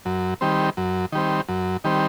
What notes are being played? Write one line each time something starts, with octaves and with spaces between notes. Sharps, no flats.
F#2
D#3 G3 C4
F#2
D#3 G3 C4
F#2
D#3 G3 C4